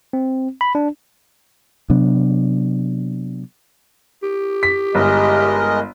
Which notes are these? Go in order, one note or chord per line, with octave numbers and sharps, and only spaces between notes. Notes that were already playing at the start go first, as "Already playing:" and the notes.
C4
B5
D4
C3 F#3 B3 D4
G4
B6
G1 G#3 A#4 D#5